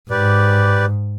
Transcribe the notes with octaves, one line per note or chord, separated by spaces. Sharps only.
G#2 G4 B4 D5